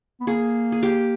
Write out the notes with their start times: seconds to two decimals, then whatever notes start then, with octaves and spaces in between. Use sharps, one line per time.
0.20 B3
0.27 A#3 G#4
0.72 G#4
0.83 G4